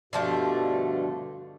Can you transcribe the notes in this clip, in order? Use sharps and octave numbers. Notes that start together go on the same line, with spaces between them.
G2 B2 D3 F3 A3